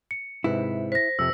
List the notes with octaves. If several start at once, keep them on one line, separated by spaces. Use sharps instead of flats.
C#7
G#2 C3 E4 B4
C5 A#6 B6
F2 C3 E6